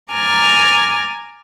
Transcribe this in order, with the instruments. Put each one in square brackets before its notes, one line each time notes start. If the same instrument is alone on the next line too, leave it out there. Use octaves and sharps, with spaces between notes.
[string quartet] G#5 A#5 D6 F6 A6